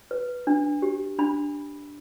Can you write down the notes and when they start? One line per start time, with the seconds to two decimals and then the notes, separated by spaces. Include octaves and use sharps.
0.11 B4
0.47 D4
0.82 G4
1.19 D4 B5